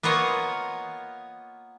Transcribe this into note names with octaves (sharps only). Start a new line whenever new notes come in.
A#3 B3 F4 C#5 D#5